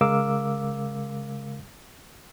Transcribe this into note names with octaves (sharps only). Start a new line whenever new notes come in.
C#3 G#3 A#4 F5 D6 E6